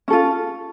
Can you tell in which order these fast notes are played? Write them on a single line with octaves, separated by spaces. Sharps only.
C#4 A4 F4